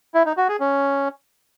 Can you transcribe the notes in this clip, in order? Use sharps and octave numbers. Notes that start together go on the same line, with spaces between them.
E4
D#4
F#4
G#4
C#4